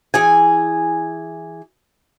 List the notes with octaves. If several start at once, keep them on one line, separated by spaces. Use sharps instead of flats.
E3 G#4 G#5